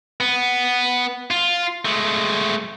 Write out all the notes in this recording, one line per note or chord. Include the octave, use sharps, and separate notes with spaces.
B3
F4
G#3 A3